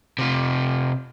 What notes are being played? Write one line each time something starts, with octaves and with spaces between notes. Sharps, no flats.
C3 F4